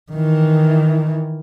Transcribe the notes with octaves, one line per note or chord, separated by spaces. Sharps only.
D#3 E3